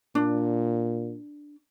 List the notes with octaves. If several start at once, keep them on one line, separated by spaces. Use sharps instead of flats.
A#2 D4